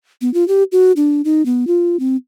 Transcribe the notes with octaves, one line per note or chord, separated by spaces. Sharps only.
B3
F4
G4
F#4
D4
D#4
B3
F4
C4